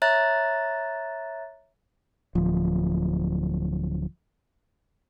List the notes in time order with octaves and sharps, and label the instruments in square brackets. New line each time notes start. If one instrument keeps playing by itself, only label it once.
[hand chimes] C#5 E5 A#5 F#6 A6
[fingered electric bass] D1 F3